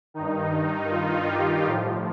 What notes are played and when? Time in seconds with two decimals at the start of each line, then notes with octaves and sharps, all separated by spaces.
0.14 G2 D#3 D#4
0.91 F4
1.28 G4
1.66 A2 F3